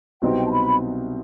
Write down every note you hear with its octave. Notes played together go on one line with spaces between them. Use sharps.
C2 B2 F#3 C4 D#4 G5
A5
B5